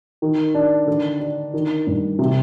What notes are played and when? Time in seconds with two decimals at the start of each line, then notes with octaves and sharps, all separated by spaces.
0.22 D#3
0.55 D4
0.87 D3
1.20 D4
1.54 D#3
1.87 G2
2.19 C3